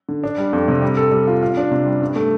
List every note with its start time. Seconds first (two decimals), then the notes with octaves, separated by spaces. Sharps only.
0.09 D3
0.24 D4
0.38 G3
0.53 F2
0.68 C3
0.82 G3
0.97 A4
1.12 G3
1.27 F4
1.42 F4
1.57 D4
1.71 C3
1.87 G3
2.01 G2
2.16 A3